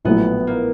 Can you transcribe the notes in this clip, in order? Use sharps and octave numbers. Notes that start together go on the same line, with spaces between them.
A#1 A2 F#3 A3 B3
A#3